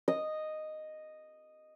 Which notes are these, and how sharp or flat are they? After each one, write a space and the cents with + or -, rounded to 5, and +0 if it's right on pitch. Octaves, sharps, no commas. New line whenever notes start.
D#5 -5